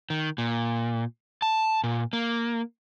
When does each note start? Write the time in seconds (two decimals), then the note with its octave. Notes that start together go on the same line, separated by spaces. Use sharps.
0.10 D#3
0.38 A#2
1.42 A5
1.84 A#2
2.13 A#3